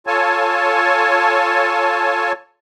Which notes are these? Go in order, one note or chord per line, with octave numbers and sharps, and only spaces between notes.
F4 A4 C#5 G#5 A5